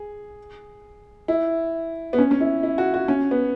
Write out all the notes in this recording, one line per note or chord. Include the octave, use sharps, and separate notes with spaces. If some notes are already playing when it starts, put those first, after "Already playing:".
Already playing: G#4
E4
B3
C#4
C#4
E4
E4
F#4
F#4
C#4
B3